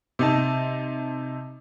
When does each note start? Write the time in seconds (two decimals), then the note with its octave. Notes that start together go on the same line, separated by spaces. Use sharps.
0.19 C3 D#4 A5